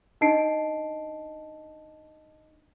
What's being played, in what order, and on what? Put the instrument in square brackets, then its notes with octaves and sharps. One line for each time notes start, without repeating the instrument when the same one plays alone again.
[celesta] D4 D#4 D#5 A5 C7 D7